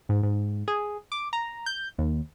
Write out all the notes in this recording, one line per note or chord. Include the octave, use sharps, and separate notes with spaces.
G#2
G#2
G#4
D6
A#5
G6
D#2